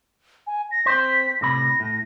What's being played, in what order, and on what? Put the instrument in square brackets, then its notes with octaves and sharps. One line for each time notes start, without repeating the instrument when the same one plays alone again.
[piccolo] G#5
A#6
[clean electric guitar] C4 C5 [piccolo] B6
[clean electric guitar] A2 C3 B5 [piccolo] A#6
[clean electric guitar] A2